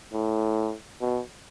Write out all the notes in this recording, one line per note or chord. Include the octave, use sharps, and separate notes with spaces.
A2
B2